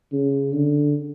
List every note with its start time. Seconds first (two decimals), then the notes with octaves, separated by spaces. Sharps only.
0.12 C#3
0.52 D3